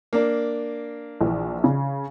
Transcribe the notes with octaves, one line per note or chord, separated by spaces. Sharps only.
A#3 D4
A#1 E3
C#3